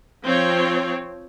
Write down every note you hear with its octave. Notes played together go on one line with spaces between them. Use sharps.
F3 C4 C#5